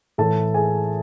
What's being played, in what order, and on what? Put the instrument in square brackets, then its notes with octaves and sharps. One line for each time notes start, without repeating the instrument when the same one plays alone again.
[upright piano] A2 E3 A4 A5
G#4 G#5